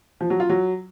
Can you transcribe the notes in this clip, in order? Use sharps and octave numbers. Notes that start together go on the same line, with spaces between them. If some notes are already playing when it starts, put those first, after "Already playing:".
F3
F#3
F4
F#3